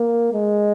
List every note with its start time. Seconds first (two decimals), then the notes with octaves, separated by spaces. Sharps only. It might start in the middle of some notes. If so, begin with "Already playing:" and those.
Already playing: A#3
0.33 G#3